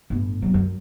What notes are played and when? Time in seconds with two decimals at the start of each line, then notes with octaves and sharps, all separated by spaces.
0.10 G1 A2
0.42 G1 F#3
0.54 F#2